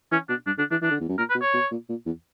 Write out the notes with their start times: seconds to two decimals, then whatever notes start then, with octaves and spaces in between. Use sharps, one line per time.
0.12 E3 C#4
0.29 B2 D4
0.46 G2 D4
0.58 D3 D4
0.71 E3 D4
0.82 E3 D4
0.91 D3
1.00 E2
1.09 F#2
1.18 A#2 A#4
1.30 B4
1.35 B2
1.42 C#5
1.54 B2
1.71 A#2
1.89 A#2
2.06 E2